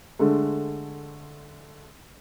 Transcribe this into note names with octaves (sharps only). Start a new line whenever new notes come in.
D3 G#3 A3